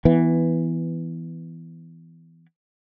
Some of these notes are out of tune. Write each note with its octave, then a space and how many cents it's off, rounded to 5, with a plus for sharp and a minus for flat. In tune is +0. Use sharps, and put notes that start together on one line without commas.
E3 +0 B3 +10